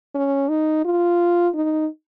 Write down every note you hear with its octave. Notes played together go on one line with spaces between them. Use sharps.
C#4
D#4
F4
D#4